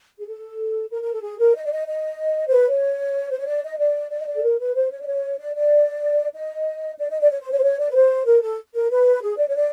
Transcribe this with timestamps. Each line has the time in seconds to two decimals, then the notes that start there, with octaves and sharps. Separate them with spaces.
0.20 G#4
0.27 A4
0.91 A#4
1.02 A#4
1.13 A4
1.23 G#4
1.39 A#4
1.56 D#5
1.65 D5
1.72 D#5
1.87 D#5
2.48 C5
2.51 B4
2.67 C#5
3.32 C5
3.39 C#5
3.47 D5
3.64 D#5
3.79 D5
4.10 D5
4.20 D#5
4.27 D5
4.36 A4
4.43 A#4
4.59 B4
4.75 C5
4.92 C#5
5.01 D5
5.07 C#5
5.39 D5
5.55 D5
6.34 D#5
6.98 D5
7.10 D#5
7.20 D5
7.31 C#5
7.41 C5
7.52 C#5
7.58 C5
7.63 C#5
7.79 D5
7.90 B4
7.95 C5
8.26 A#4
8.42 A4
8.74 A#4
8.91 B4
9.22 G#4
9.38 D5
9.48 C#5
9.56 D5